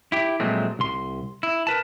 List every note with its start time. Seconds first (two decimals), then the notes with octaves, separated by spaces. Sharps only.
0.12 E4 G4
0.40 A#2 F3 F#3 G#3 A3 C4
0.79 C2 C6
1.43 E4
1.67 A#4 B4 A5